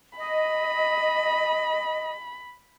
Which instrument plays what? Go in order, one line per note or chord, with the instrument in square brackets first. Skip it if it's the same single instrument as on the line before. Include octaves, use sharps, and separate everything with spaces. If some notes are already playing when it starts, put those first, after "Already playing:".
[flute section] D#5 [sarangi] B5